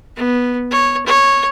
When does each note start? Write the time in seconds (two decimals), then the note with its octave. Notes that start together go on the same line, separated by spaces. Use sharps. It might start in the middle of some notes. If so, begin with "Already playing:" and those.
0.16 B3
0.71 C#5
1.06 C#5